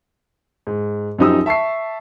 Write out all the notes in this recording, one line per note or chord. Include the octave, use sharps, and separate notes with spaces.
G#2
F#2 F3 D#4 G4 D#6 E6
E5 A5 C#6 E6 C7